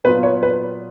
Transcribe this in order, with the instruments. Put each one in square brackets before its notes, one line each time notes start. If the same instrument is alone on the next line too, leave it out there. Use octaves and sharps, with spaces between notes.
[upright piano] A#2 F#3 B3 F4 B4
C#5
B4